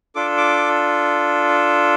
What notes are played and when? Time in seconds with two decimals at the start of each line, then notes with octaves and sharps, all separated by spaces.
0.15 D4 F4 A4 D6
0.37 D6